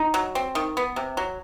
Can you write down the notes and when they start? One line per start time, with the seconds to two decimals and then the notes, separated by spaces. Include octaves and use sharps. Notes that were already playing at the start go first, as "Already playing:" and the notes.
Already playing: D#4
0.14 F#3
0.35 C4
0.55 D#3
0.77 B3
0.96 C3
1.17 F#3